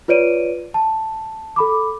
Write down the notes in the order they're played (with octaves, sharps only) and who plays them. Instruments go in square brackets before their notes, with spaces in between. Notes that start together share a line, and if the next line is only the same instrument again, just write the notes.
[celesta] F4 B4 C#5 D5 D7 D#7
A5
A4 B5 D6